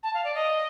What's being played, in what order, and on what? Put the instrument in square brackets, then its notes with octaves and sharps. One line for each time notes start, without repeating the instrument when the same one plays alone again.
[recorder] A5
F5
D5
D#5